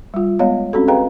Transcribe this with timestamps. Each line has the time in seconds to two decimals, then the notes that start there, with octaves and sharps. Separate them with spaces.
0.14 G3 F4
0.39 G#3 B3 C#5 D#5 F5
0.73 C4 C#4 F#4 A4
0.88 G#4 B4 D#5 F5 G5 A#5